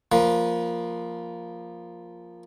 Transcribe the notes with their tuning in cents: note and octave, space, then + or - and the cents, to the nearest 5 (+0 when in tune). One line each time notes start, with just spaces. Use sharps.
F3 +0 A#3 +0 B4 -20